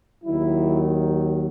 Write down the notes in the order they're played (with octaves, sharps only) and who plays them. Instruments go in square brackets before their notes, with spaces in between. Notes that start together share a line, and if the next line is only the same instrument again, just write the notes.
[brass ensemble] D#2 D#3 F#3 E4